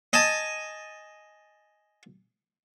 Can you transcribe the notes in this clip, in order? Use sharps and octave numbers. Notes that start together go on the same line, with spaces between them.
D#5 G#5 A5 D#6